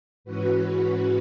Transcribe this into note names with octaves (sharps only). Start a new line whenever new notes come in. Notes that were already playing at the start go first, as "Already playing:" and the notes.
G#2 E3 C#4 F#4 B4